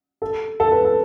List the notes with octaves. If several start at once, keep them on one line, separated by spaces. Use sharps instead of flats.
A4
A4
B4
A4